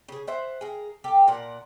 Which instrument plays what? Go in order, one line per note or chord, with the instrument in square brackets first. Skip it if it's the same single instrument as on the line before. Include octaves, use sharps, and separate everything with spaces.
[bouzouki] C#3 G#4
C5 E5 F#5
G#4 A#4
G4 A4
A#2 A#4 F#5